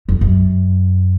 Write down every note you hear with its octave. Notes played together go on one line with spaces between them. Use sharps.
F2
F#2